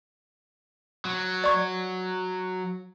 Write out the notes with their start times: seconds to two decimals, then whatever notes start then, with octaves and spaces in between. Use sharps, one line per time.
1.05 F#3
1.44 D5 C#6 G#6